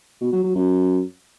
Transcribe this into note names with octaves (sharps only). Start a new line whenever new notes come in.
B2
F#3
F#3
F#2